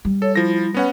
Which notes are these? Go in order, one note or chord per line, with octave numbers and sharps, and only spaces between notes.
G3
A4 C#5
F3 E4 A#6
B3 C#4 B4 F#5